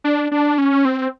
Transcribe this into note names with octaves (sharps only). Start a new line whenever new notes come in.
D4
D4
C#4
C4